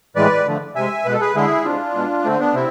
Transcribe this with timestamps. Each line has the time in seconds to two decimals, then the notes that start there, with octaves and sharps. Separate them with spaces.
0.16 A2 E3 G#3 B4 D5
0.46 D3 F3 A3
0.75 C3 G#3 E5 G#5
1.06 B2 G#3 B4
1.13 A4
1.21 G#4 B4
1.35 D3 G#3 E4 G#4
1.65 C3 G#3 D4 F4
1.95 B2 G#3
2.24 D3 A3 C4
2.39 B3 D4
2.54 C3 C4 E4